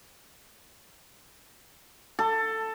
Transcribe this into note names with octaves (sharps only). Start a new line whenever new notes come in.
A4